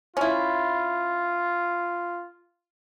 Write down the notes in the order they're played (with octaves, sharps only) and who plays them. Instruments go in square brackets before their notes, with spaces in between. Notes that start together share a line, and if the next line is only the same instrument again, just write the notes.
[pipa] C#4 E4 [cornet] F4